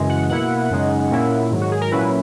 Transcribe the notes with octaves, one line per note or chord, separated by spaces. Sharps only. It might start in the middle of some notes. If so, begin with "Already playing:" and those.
Already playing: F#2 C#3 E3 G#3
F#5
B2 A#3 E4 F#5
F#2 C#3 G#3 D#4
A#2 A#3 C#4 E4
G#2 D#3 F#3
F#4
G#4
A#4
A#2 F#3 C#4 E4 B4